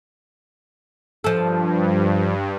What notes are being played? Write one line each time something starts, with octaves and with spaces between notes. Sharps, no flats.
G2 F3 A4